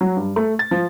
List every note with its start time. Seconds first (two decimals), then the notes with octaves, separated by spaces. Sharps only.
0.01 F#3
0.17 G2
0.36 A3
0.59 A6
0.71 F3